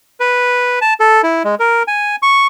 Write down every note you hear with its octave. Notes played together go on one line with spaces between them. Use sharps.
B4
A5
A4
E4
G#3
A#4
G#5
C#6